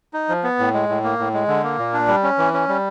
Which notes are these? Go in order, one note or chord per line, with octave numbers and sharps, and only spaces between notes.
D#4
F3
B3
A2
G#3
A2
A#3
A2
G#3
D3
A#3
A#2
D4
G3
C#4
E3
C#4
G3